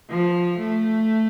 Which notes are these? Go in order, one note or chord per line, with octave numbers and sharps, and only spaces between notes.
F3
A3